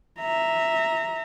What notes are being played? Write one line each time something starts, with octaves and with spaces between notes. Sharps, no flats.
E5 A#5